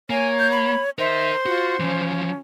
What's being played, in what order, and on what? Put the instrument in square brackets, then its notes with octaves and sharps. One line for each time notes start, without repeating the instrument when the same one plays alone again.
[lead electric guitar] A#3 [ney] C#5 [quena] G#5
[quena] G6
B5
[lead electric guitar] A#4 D#5 [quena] C5 [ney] E5
[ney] F4 [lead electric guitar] F#4
[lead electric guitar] E3 F3 [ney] C#4